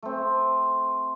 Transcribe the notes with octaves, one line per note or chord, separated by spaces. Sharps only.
A3 C4